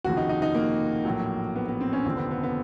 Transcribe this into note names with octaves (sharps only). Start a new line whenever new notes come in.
F1 D#2 C#3 F3 F#4
D#4
D#4
D#4
A#3
A#1 A2 F#3
B3
B3
C4
C#4
F1 D#2 D3 F3 C4
B3
B3
B3